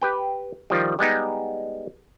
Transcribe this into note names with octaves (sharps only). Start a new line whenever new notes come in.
G4 B4 G5
D#3 F3 G3
G3 G#3 B3 D#4